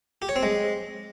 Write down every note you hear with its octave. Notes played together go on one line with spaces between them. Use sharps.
G4
C#5
C4
G#3